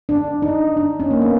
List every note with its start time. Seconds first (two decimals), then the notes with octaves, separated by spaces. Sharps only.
0.09 D4
0.42 D#4
0.77 D4
1.00 C#4
1.11 A#3
1.21 B3